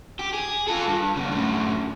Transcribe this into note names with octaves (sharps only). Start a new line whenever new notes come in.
G4
G#4
F4 A4
G2
F#2 C#3
F#2 A2